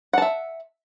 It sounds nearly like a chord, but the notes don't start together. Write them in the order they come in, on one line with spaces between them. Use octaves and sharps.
F#5 A5 E5